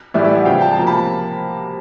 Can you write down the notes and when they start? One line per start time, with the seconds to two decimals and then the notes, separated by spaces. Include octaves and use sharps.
0.14 A2 E3 G3 B3 D5 E5
0.24 D5 E5
0.35 E5 F#5
0.45 C#3 F3 G#3 F5 G5
0.61 G5 A5
0.73 A5
0.77 C3 F3 A#3 G#5 A#5
0.87 A5 B5